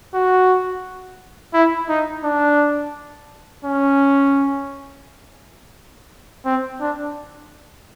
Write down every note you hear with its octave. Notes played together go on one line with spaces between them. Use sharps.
F#4
E4
D#4
D4
C#4
C4
D4